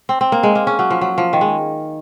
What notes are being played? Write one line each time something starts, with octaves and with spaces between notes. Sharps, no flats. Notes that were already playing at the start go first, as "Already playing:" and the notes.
C4
C4
A#3
G#3
A#3
C#4
F#3
F3
F#3
F3
D#3
G#3